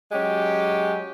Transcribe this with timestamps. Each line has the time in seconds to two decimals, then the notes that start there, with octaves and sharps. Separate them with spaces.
0.12 F#3 G#3 C#4 G4